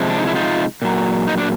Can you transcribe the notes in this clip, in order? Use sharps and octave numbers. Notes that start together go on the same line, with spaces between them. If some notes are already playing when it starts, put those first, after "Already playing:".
Already playing: C3 F3 G#3
D4
D#4
E4
D#4 F4
A#2 F#3
D#4
D4